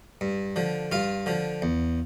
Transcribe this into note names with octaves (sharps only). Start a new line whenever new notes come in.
G2
D3 F3
G2 F4 F5
D3 F3
E2